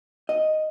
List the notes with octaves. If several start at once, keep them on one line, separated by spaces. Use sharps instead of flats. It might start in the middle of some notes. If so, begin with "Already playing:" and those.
D#5